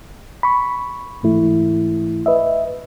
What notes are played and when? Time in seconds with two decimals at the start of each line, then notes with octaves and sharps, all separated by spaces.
0.43 B5 C#6
1.23 G#2 E3 A3 E4
2.26 B4 D#5 E5